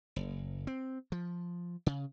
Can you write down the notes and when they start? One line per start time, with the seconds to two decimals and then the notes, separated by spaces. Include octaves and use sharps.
0.16 F#1
0.67 C4
1.12 F3
1.86 C#3